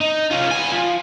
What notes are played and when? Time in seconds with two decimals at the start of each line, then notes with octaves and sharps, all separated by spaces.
0.01 D#4
0.31 C#4 F4
0.51 B3 G#5
0.72 F3